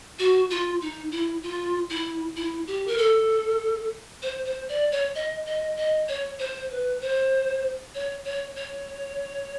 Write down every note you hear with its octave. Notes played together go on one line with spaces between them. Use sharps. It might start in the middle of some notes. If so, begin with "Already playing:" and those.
F#4
F4
D#4
E4
F4
E4
E4
G4
A#4
A4
C5
C5
D5
C#5
D#5
D#5
D#5
C#5
C5
B4
C5
C#5
C#5
C#5